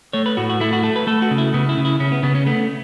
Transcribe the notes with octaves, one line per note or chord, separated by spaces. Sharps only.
A3 C#5
B4
A2 F#4
F#4
A3 E4
F#4
A3 A4
B4
A3 A4
F#4
C#3
E4
C#3 B3
E4
C#3
E4
C#3 C#4
B3
C#3 B3
C#4
A3 B3